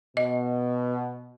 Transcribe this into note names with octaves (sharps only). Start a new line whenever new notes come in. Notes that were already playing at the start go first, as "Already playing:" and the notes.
B2 D#5